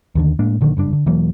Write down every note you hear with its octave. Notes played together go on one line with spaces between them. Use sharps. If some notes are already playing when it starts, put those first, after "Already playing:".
D#2 D3 D#3
A2 G#3 A#3 D4
A#1 D3 D#3 A#3
F#1 G2 D4
D3
E1 E3 F#3 A#3